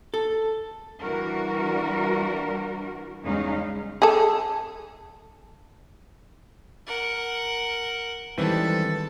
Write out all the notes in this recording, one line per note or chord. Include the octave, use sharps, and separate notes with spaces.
A4
E3 G3 D4 F#4 A#4
E2 G2 C#3 G#3 D#4 F5
G#4 A4
A#4 F#5
D#3 E3 G3 G#3 C4 C#4 A4 B4